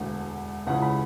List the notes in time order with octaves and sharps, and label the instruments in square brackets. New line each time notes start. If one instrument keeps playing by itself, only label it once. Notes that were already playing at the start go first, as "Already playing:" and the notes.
Already playing: [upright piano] E1 D2 D3
C#2 C#3 E3 F#5
B5